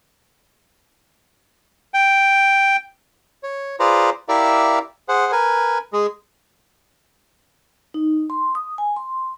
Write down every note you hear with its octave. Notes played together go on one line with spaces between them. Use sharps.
G5
C#5
F4 G#4 B4 C5 D5 A#5
E4 G4 A#4 D5 E5 F5
G#4 C5 F#5
A#4 B4 G#5
G#3 G#4
D#4
C6
D#6
G#5
C6